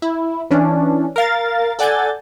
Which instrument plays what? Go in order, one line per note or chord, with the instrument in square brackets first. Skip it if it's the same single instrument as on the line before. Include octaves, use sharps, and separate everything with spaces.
[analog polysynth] E4
E3 C#4 D4
A#4 F5 A6
A4 D5 F#5 G#5 G6 A6